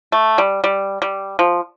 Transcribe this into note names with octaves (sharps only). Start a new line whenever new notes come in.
A3
G3
G3
G3
F3